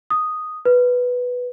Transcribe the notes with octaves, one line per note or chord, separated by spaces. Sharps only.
D#6
B4